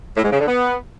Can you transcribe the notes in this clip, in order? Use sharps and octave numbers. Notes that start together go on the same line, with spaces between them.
A2
G#2
C#3
D3
B3